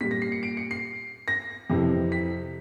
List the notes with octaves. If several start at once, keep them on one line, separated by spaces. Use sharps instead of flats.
A#2 G3 B6
A#6
C7
C#7
D7
C#7
C7
A#6
F2 C3 E3
B6